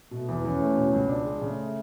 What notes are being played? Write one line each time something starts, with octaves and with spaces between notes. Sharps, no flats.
B2 A3
E2
E2 C#4
A3
B2
C#2
D4
G#3
C#3 A3